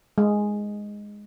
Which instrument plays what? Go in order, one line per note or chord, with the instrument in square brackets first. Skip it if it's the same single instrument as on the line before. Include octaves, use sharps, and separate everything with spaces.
[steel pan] G#3